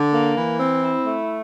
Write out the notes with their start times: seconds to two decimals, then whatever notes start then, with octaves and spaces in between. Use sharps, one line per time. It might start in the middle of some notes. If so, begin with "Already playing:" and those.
Already playing: D3
0.12 A#3
0.36 E3
0.60 C4
0.83 E4
1.06 A3